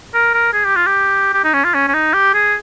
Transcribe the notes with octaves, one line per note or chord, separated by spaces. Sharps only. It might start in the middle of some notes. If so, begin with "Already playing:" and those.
A#4
A#4
G#4
G4
F4
G4
G4
D#4
C#4
F4
C#4
C#4
D#4
G4
G#4